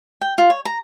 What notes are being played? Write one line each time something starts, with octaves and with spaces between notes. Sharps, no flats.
G5
F4
C#5
A#5